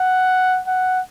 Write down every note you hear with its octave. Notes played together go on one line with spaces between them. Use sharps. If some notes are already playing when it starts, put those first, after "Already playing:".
Already playing: F#5
F#5